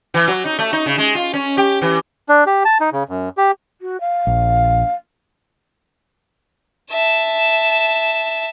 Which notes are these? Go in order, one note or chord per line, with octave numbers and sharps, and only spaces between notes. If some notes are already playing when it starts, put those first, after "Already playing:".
E3
F#3
D#4
A3
D#4
C#3
G#3
F4
C#4
G4
E3
D4
G4
A5
D#4
C#3
F#2
G4
F#4
F5
A#1
E5 A5